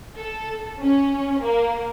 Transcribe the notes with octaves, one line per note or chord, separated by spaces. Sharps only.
A4
C#4
A#3